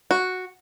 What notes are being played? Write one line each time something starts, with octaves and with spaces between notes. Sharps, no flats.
F#4